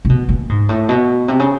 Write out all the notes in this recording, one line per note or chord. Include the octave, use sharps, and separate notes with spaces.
C3
B2
A#2
G#2
A2
B2
C3
C#3